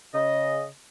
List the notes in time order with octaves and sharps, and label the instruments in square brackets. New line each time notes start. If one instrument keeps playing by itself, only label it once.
[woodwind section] C#3 D#5